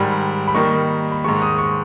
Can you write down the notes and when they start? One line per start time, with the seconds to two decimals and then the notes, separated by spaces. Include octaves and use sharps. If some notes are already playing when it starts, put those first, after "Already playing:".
Already playing: G#2 D#3 G3 B5
0.48 B5
0.55 D#3 G3 A#3 D#4 C#6
1.12 B5
1.24 G#2 D#3 G#3 C#6
1.42 D#6
1.58 C#6